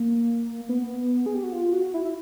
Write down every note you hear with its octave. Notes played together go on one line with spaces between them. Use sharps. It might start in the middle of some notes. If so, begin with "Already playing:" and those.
Already playing: A#3
B3
B3
G#4
G4
F#4
F4
F#4
E4
E4